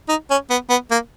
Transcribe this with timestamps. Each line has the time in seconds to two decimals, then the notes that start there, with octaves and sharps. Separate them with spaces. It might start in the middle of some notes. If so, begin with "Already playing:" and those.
0.09 D#4
0.30 C#4
0.50 B3
0.70 B3
0.91 A#3